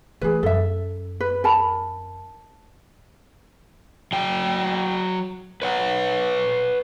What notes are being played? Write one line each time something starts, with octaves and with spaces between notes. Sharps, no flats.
E3 A3 G#4 B4
F#2 A4 E5
B4
A#4 A5 B5
F#3 G5
B4 C#5 F#5